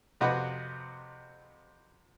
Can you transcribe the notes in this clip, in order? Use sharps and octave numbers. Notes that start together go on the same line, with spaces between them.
F2 C3 F#4 B4 D#5 B5